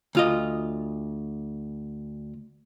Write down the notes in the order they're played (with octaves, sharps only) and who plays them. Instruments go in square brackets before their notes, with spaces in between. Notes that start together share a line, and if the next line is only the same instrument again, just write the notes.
[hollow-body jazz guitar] D2 F4 D#5